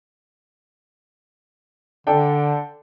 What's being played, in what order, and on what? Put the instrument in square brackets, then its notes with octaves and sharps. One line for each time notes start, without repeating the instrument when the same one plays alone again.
[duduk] D3 [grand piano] D4 A4 G5